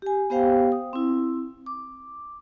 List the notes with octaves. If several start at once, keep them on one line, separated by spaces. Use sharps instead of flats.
G4 G#5
B3 G4 C5 F5 G5
D#6
C4 E4
D6